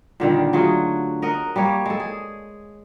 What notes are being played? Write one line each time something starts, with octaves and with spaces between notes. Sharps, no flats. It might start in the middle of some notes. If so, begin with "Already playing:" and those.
A#2 D3 D#3 G3
F#3 A3 F4 G#4
A#4 D#5 F#5
G3 A#3 C#5
G#3 A4
G#4